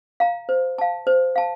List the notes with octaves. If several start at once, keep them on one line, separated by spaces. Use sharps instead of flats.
F5 A#5
C5
F5 A5
C5
F5 A5